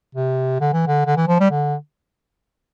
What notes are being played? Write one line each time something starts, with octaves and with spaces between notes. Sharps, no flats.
C3
D3
E3
D3
D3
E3
F3
G3
D3